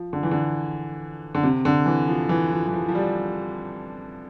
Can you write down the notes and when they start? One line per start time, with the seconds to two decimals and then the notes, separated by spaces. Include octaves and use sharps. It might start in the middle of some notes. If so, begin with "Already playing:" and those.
Already playing: F3
0.13 D3
0.23 E3
0.31 D3
1.35 D3
1.43 C3
1.65 D3
1.86 E3
2.08 F3
2.29 E3
2.51 F3
2.67 E3
2.73 F3
2.88 F3
2.95 G3